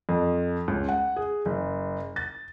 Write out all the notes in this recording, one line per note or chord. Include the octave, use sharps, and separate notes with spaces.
F2
C#2
F#5
G#4
F#1
A6